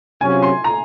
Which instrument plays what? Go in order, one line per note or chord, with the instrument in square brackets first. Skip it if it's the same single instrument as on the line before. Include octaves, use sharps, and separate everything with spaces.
[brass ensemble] C3 F#3 C#4 F4 [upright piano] G#5
[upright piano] C6
A#5